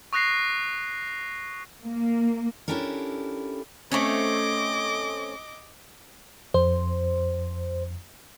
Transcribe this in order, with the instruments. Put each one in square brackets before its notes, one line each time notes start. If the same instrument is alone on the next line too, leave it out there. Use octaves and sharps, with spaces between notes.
[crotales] C#6 D#6 F#6 A#6 C7
[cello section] A#3
[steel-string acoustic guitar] C#4 D4 E4 G4 A4 A#4
[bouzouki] A3 C4 C#4 [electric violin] D#5 D6
[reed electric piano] F2 [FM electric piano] C5